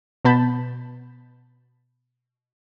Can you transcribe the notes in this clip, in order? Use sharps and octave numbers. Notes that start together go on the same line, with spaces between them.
B2 B3 A5 B5 G6